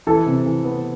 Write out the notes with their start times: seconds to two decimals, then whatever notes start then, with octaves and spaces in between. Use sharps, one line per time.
0.07 E3 A4
0.26 C3
0.46 E3
0.65 B3